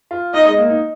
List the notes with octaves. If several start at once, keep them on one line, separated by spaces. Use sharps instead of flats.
F4
D#4 D#5
G#3
A#3
D#4